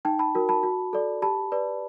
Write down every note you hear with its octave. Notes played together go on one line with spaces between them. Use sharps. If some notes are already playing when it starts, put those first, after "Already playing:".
D#4 G5 A5
A5 B5
F#4 A#4
A5 B5
F#4
A4 D5
G4 A5 B5
B4 D5